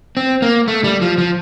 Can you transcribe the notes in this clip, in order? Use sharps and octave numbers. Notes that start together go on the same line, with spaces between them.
C4
A#3
A3
G3
F3
F3